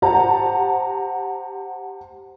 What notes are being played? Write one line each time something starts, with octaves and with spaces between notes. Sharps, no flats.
G4 C5 F#5 A5 A#5